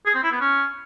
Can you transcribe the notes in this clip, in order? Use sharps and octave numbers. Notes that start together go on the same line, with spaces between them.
G#4
C4
E4
B3
C#4